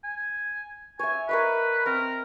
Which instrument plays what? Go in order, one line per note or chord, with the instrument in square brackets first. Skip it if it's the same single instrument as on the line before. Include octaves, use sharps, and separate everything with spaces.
[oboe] G#5
[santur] C#5 E5 [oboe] G#5
[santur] A#4 C#5 D#5 [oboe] B4
[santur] C4 C6 [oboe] A#4